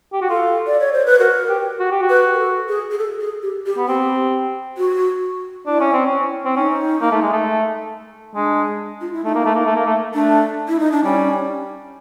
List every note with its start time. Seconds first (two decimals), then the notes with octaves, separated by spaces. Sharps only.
0.13 G4
0.21 F#4
0.30 F4 A4
0.67 D5
0.80 C#5
0.93 C5
1.06 B4
1.19 F#4 A#4
1.49 G4
1.79 F#4
1.91 G4
2.02 F#4
2.09 B4
2.34 A#4
2.39 A4
2.68 G#4
2.91 G#4
2.99 A4
3.21 G#4
3.43 G4
3.66 G4
3.77 B3
3.88 C4 G4
4.78 F#4
5.66 D4 E4
5.80 C#4
5.93 C4
6.05 C#4
6.45 C4
6.56 C#4 D#4
7.01 A#3
7.11 A3
7.22 G#3
7.33 A3
8.35 G#3 D4
9.01 F4
9.13 E4
9.25 A3 D#4
9.35 A#3
9.45 A3
9.55 A#3
9.65 A3
9.76 A#3
9.86 A3
10.15 A3 D4
10.68 E4
10.79 D#4
10.92 D4
11.04 G3 C#4